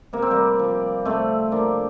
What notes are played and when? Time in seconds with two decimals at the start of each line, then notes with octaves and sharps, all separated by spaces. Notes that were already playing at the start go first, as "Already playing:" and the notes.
0.13 C3 A#3
0.22 C4
0.31 G3 A#3
0.59 F3
1.05 C3 A3 C4
1.52 F3 A#3 D4